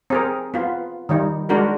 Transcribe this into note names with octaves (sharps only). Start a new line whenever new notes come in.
C4 G#4 A#4
B3 F4
D#3 G3 D#4
G#3 D4 F#4 A#4